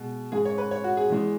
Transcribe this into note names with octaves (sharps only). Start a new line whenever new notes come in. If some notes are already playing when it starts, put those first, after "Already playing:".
Already playing: B2 G#3
G#2 G#3 G#4
C#5
B4
C#5
F#4
G#4
E2 E3 G#3